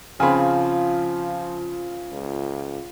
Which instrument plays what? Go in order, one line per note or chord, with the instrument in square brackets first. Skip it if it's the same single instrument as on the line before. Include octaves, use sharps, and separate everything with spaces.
[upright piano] C#3 C4 [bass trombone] F3 [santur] F4 [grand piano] G#5 B5
[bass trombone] C#2